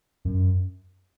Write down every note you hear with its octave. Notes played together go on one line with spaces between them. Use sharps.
F#2